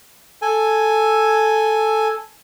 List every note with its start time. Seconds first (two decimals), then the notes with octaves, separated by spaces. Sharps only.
0.42 A4 G#5